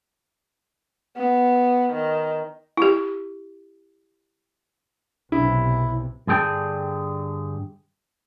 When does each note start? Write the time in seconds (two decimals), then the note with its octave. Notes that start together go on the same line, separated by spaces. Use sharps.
1.17 B3
1.93 D#3
2.77 E4 G4
5.32 B1 C3 E4
6.27 G2 D3 G#4 G5 A5